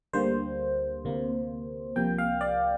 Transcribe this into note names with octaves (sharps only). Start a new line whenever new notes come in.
D2 D3 G3 A#3 C5
D2 C3 A#3
C2 C3 F3 A#3 G5
F5
D5